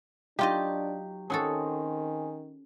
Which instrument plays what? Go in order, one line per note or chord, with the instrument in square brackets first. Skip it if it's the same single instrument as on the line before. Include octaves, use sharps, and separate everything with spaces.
[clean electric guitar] F#3 [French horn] D4 [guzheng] D#4 F4 D#5 [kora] G4
[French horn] D#3 [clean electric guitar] C4 G#4 [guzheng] C#4 F#4 A4